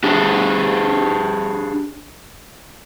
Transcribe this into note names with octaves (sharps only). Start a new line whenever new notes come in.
D4 G4 G#4